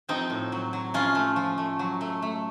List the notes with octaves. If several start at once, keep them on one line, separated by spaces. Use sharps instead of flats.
F3 C4 D#4
A2
F#3
F#3
F3 C#4 F4
A3
F3
A3
F#3
A3
A3